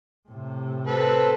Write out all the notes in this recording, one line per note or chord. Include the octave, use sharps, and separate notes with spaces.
A2 C3
C4 A4 B4